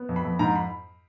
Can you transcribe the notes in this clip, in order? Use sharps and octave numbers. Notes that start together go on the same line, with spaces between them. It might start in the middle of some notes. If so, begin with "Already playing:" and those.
Already playing: B3
F2
B5
F2
G#2 A#5
B5